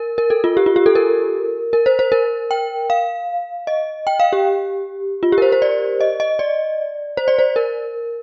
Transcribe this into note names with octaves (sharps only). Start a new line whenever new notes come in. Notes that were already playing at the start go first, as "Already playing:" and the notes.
Already playing: A#4
A#4
A4
F4
G4
F4
G4
A4
A#4
A#4
C5
C5
A#4
G5
F5
D#5
G5
F5
G4
F4
G4
A#4
C5
C5
D5
D#5
D#5
D5
C5
D5
C5
A#4